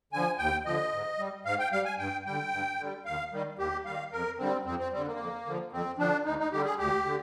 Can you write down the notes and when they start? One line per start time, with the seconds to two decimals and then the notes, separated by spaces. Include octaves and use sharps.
0.13 D3 F3 G#5
0.38 D#2 G5
0.66 D3 F3 D#5
0.93 G#2
1.18 G3
1.45 G#2 F5
1.59 G5
1.72 G3 F5
1.85 G#5
1.98 G2 G5
2.26 D3 G3 G5
2.52 G2
2.79 D3 G3
3.05 D#2 F5
3.32 D#3 G3
3.59 D#2 G4
3.85 D#3 G3 F5
4.12 F2 A#4
4.39 D3 G3 C4
4.65 F2 C4
4.79 C4
4.92 D3 G3 C4
5.06 A#3
5.18 F2
5.46 D3 F3
5.72 F2 C4
5.98 D3 F3 D4
6.25 D2 D#4
6.39 D#4
6.52 D3 G3 G4
6.65 G#4
6.78 D2 G4
7.06 D3